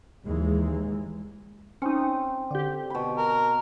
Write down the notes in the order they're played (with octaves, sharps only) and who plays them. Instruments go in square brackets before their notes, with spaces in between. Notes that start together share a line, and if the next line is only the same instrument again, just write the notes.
[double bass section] D#2 E3 G#3
[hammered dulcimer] C4 [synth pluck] C#4 D#4
[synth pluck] D3 G4
[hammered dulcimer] B2 B5
[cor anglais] A#4